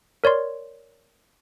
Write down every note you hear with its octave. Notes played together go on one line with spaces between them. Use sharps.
A#4 C#5 D5 C6